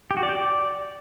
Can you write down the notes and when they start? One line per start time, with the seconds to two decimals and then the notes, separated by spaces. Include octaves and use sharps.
0.11 G4
0.17 F#4
0.23 D5
0.29 G4
0.35 D5